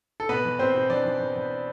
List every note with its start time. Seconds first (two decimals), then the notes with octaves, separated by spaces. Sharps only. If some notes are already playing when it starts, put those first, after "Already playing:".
0.20 A4
0.29 B2 B3 B4
0.45 E2
0.59 B2 C4 C5
0.75 B2
0.89 E2 D4 D5
1.05 E2
1.20 E2
1.35 E2